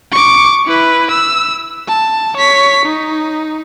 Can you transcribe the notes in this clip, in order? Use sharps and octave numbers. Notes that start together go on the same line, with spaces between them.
C#6 D6
E4 B4
E6
A5
C#5 B6
D#4